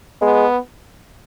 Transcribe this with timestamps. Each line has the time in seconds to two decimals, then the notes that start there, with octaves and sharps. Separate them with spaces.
0.22 G#3 B3